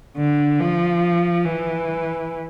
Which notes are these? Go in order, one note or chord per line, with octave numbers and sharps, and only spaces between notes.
D3
F3
E3